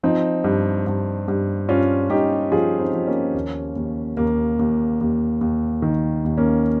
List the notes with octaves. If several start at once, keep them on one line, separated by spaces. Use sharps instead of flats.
F3 C4 D#4
G2
G2
G2
G2 C#4 F4
G2 D#4 G4
F3 F4 G#4
C4 D#4
F3
A#3 C#4
D#2
D#2
D#2 A#3
D#2
D#2
D#2
D#3
D#2
A#3 C#4